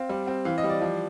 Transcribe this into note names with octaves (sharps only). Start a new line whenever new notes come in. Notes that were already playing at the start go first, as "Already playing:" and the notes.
Already playing: C4 F5
G3
C4
E3 F5
D#5
G3
D5
F3